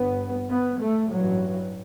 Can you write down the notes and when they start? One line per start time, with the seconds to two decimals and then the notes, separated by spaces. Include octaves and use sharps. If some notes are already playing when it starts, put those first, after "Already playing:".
Already playing: G1 G2 B3
0.49 B3
0.79 A3
1.11 A1 G2 F#3